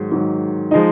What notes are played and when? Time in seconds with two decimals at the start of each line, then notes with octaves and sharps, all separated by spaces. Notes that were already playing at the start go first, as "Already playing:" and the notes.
Already playing: G#2 D#3 F#3
0.11 G#2 D#3 F#3
0.71 F3 G#3 D#4